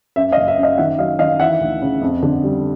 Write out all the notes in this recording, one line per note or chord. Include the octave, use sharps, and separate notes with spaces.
F#2 E5
D#5 F5
F#1
E5
F#2
D#5 F5
D#3 E5 F#5
F#3 D#5 F5
D#3 D#5 F5
E3 E5 F#5
D2
C#3
F2
D3
G3